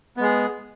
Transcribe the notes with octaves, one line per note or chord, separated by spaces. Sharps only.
G#3 B3 G#4